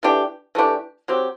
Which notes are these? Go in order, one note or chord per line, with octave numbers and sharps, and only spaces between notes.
E3 A3 D4 G4
E3 A3 D4 G4
F#3 C4 G4